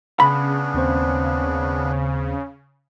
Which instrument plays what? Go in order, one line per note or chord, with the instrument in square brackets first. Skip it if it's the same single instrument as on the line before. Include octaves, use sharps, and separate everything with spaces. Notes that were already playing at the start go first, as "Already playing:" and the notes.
[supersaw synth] C#3 [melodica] B3 D4 [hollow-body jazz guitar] B5
[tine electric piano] D#2 C4 C5